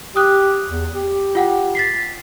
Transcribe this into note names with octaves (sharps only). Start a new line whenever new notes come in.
G4 D#6 F#6
E2
G4
F4 F#5 G5
A6 B6 C7